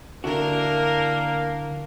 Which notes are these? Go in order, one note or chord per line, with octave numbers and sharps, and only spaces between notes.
D3 A#3 D4 E4 F#4 A#4